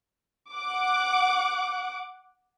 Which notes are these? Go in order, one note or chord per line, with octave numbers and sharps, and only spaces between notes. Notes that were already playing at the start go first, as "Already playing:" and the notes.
F#5 D6